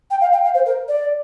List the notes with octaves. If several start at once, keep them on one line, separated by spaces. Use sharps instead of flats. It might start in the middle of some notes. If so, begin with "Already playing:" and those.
G5
F5
G5
F5
C5
A#4
D5